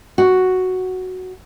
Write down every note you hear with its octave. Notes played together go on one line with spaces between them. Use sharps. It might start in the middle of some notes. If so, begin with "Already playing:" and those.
F#4